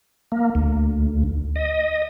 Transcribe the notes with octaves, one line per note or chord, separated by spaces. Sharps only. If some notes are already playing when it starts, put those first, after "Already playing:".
A#3
D2
D#5